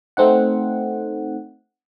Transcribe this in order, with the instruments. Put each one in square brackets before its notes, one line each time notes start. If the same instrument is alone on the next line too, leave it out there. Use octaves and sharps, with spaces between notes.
[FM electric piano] A3 C4 D#4 F#5